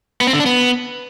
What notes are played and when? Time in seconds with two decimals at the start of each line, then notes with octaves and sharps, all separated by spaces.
0.21 B3
0.27 C4
0.33 D3
0.40 D4
0.46 B3